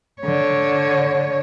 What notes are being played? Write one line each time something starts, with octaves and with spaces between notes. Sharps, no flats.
D3 C#5